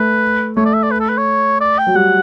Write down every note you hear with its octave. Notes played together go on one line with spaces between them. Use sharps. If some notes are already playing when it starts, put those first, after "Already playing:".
Already playing: A3 B4
A3 C#5
D5
E5
D5
B4
A4
B4
C#5
D5
G5
F#3
G3 F#5